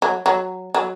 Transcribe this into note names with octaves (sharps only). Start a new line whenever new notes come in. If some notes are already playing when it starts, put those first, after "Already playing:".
F#3
F#3
F#3